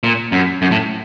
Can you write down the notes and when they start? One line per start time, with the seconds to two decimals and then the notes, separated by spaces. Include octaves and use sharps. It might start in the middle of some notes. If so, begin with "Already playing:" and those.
0.04 A#2
0.32 F#2
0.62 F#2
0.71 A2